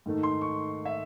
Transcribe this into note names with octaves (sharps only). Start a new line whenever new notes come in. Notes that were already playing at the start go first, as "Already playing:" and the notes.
G#2 D#3 A3
C6
C#6
E5